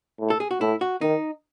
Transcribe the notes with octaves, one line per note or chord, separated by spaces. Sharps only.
A2
A4
G#4
F#4
A2 E4
F#4
D#3 D#4